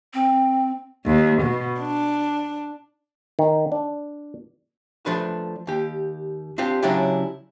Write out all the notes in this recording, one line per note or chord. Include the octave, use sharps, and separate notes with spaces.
C4
D#2
B2
D4
D#3
D4
F3 A3 D4 B4
D#2 G4
C4 D4 F4 G4
C#3 F#3 C#4 D4 E4 G4